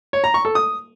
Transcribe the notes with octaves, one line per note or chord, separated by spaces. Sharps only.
C#5
A#5
C#6
A4
D#6